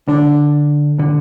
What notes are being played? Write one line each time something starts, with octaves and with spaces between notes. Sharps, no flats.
D3 D4
D3